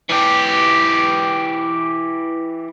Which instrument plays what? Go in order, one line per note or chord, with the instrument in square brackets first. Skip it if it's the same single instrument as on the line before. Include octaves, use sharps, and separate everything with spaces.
[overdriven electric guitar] E3 G4